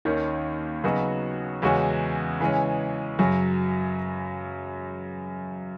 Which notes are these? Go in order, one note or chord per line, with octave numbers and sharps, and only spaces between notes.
D#2 D#3 A#3 C#4
C#3 F#3 B3 D#4 F#4
E2 C#3 G#3 C#4 F#4
C#3 E3 G#3 C#4
F#2 C#3 F#3